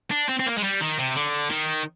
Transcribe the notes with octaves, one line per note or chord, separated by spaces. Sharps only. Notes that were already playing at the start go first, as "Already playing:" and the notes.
D4
C4
C4
A#3
G#3
G3
D#3
C3
D3
D#3